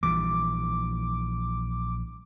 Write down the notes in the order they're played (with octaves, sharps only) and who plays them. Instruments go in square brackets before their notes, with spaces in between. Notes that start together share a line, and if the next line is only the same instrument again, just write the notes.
[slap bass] A#1 E3 G3 [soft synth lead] D6